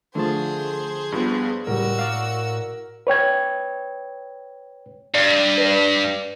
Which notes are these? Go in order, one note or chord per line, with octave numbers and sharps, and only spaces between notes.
D3 F3 A3 G#4 C5 A5
G2 F3 B3
C#2 A2 G3 F#4 A#4 E6
D5 F5
B4 C#5 G5 G#6
G2 D5
B4 D5